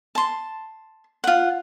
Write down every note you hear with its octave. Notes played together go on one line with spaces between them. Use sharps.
A5 C6
F4 F#5